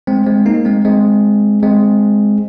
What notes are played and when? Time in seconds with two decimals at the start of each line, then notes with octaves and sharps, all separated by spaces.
0.07 G#3 C4
0.27 G#3 C4
0.46 A#3 D#4
0.65 G#3 C4
0.85 G#3 C4
1.63 G#3 C4